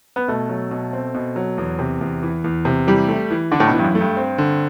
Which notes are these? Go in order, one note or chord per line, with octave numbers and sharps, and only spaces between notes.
B3
B2 A3
F#3
B2
C4
B2
F#3
E2
C3
E2
E3
E2
C3
E3 G3
A3
E3
D3 D4
A2
B2
E3
G2
F#2
A3
G2
C4
D3